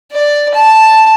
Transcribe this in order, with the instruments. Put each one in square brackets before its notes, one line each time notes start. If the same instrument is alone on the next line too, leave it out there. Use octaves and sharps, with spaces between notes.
[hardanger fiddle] D5
A5